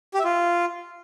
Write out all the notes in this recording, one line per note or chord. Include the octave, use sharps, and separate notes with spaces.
G4
E5
F4